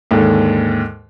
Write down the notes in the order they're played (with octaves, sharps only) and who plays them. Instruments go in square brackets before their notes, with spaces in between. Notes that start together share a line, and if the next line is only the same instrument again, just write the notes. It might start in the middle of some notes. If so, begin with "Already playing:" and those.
[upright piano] D#2 G#2 D3